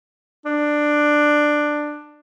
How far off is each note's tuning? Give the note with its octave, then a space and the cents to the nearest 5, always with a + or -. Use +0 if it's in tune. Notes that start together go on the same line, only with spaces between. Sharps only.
D4 +10